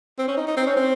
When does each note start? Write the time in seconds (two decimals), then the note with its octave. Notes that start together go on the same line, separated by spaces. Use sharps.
0.18 C4
0.28 C#4
0.37 D#4
0.47 D#4
0.57 C4
0.67 C#4
0.77 C4